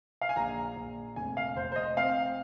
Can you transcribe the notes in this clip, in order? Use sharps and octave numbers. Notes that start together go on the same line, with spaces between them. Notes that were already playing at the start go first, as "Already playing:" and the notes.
F5
G#5
A#1 A#5
A#1
F1 G#5
F5
F1 C5
C5
D#5
C4 F5